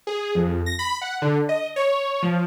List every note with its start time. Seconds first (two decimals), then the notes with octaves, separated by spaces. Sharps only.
0.07 G#4
0.35 F2
0.66 A#6
0.79 B5
1.02 F#5
1.22 D3
1.49 D#5
1.76 C#5
2.22 F3